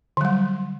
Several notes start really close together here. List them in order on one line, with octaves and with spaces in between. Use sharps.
D3 F#3 G3